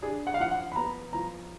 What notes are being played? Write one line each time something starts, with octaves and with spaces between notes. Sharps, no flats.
D4 G#4
F#5
F5
F3 F#5
F#5
B5
B3 A#5
F3 A#5